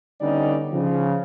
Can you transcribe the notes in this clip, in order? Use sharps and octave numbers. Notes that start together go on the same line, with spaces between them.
D3 G3 B3 C#4 D#4 D5
C#3 F3